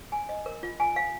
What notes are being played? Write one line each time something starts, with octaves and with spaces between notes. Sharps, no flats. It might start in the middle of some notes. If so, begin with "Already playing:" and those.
G#5
D#5
A#4
F4
G#5
F5